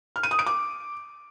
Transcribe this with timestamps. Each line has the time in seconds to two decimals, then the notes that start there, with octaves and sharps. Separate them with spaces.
0.16 F6
0.23 D#7
0.31 D#6
0.39 D7
0.46 D6